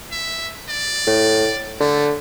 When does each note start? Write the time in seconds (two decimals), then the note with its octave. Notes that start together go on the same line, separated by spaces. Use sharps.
0.11 E5
0.69 D5
1.07 A2
1.80 D3 A3